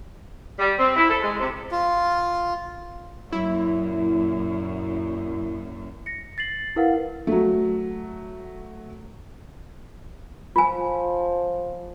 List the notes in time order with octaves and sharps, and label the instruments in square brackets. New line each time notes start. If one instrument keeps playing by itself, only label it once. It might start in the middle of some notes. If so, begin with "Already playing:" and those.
[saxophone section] G3
C4
E4
A4
G#3
C3
[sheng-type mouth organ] F4
[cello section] F#2 A#2 [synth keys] E4
[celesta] A#6 C#7
A6 C7 F#7
E4 A#4 B4 F5 F#5
[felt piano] F#3 A3
[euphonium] F3 [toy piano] F4 G#5